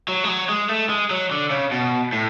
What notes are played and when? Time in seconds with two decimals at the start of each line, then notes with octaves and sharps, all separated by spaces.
0.08 F#3
0.24 G#3
0.29 F#3
0.49 G#3
0.69 A3
0.90 G#3
1.11 F#3
1.31 D3
1.51 C#3
1.72 B2
2.13 A2